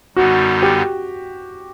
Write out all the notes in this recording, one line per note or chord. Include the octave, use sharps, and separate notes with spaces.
F#2 D3 G3 B3 D#4 F#4
G4